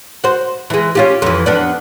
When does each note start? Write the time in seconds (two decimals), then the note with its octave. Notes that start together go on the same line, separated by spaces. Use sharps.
0.24 F#4 C5
0.70 E3 G#3
0.95 C#4 F4 G4
1.22 F2 E3
1.46 F2 B3 D4